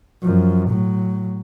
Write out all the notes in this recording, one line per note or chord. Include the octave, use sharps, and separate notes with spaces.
F#2 F3
A2 F#3